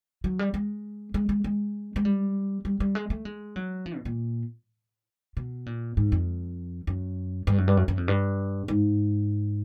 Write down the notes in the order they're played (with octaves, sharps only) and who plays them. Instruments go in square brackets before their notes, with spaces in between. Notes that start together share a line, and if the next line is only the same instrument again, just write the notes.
[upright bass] F#3
G3
G#3
G#3
G#3
G#3
G#3
G3
G3
G3
G#3
A3
G#3
F#3
F3
B2
A#2
B2
A#2
G#2
F2
F#2
G2
F#2
G2
F#2
F#2
F2
G2
G#2